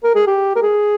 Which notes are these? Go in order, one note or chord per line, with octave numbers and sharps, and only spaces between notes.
A#4
G#4
G4
A#4
G#4